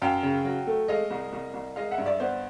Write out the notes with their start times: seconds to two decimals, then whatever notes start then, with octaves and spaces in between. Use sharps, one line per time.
0.02 F#2 F5 G5
0.23 C#3
0.45 F#3
0.67 A3
0.88 G#3 D#5 F5
1.11 C2
1.33 C2
1.54 C2
1.76 G#3 D#5 F5
1.91 E5 F#5
1.98 G2
2.05 D5 E5
2.20 B3 C5 D5